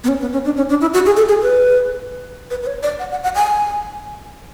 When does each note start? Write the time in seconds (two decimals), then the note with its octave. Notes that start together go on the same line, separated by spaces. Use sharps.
0.04 B3
0.08 C#4
0.21 B3
0.33 C#4
0.45 D4
0.57 C#4
0.69 D4
0.81 E4
0.94 F#4
1.06 G#4
1.17 A4
1.29 G#4
1.42 B4
2.50 B4
2.62 B4
2.67 C#5
2.83 D5
2.99 F#5
3.11 F#5
3.23 F#5
3.35 G#5